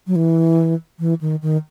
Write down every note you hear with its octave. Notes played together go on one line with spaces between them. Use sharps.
F#3
E3
E3
D#3
D#3